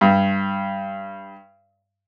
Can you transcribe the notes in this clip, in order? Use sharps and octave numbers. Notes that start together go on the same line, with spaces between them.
G2